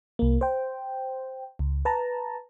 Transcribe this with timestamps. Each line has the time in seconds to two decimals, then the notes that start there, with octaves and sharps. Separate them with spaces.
0.19 C2 A#3
0.41 C5 G5
1.59 C#2
1.85 B4 A5 A#5